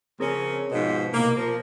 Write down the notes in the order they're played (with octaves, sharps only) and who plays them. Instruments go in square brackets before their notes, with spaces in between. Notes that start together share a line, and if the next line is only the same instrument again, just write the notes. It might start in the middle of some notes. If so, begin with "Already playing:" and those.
[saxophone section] C#3 F3 C#4 [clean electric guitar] C4 G#4 A#4
[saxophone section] G#2 B2 F3
[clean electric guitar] C2 B2 [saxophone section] A#3
[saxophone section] F3 [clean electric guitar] A#4